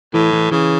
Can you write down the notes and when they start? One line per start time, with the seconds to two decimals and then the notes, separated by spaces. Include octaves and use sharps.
0.14 A2 E3
0.33 E3
0.51 C#3 E3